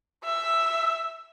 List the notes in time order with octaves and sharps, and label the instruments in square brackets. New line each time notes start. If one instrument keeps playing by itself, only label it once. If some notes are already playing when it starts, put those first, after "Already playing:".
[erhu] E5